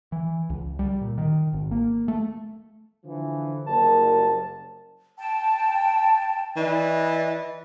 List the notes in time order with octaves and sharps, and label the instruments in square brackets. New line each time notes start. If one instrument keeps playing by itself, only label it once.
[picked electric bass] E3
C#2
G3
A#2
D#3
G#1
A#3
A3
[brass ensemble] D3 E3 F3
[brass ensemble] F#1 C2 A#4 [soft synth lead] A5
[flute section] G5 A5
[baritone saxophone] E3 [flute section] D5 D#5